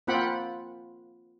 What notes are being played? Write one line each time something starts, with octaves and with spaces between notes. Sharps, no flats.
A#3 C4 F4 F#5 G5 B5